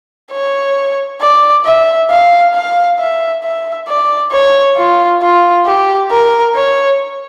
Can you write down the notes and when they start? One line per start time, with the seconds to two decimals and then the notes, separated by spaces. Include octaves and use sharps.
0.32 C#5
1.21 D5
1.65 E5
2.10 F5
2.54 F5
2.99 E5
3.43 E5
3.88 D5
4.32 C#5
4.77 F4
5.22 F4
5.66 G4
6.11 A#4
6.55 C#5